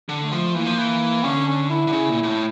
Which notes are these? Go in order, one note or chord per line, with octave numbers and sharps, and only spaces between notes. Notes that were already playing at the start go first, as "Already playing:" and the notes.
D3
A3
F3
A3
E3 A#3
F3
E3
D3 C#4
C#4
E4
D3
C#3
A#2
A#2
A2